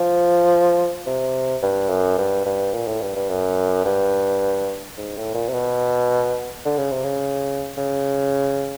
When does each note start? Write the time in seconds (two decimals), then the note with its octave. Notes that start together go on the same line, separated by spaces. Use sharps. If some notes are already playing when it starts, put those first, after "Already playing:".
Already playing: F3
1.06 C3
1.62 G2
1.90 F#2
2.18 G2
2.45 G2
2.73 A#2
2.87 A2
3.02 G2
3.16 G2
3.30 F#2
3.85 G2
4.97 G#2
5.17 A2
5.35 A#2
5.49 C3
5.54 B2
6.65 D3
6.78 C#3
6.91 C3
7.04 C#3
7.78 C#3